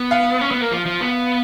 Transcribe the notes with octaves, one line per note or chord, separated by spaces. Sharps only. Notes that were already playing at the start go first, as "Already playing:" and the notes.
Already playing: B3
F5
C#4
B3
A#3
F3
F3
B3